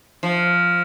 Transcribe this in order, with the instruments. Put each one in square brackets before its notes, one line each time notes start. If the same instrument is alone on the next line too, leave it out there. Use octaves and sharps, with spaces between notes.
[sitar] F3